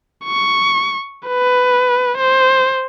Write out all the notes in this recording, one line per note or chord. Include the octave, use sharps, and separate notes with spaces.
C#6
B4
C5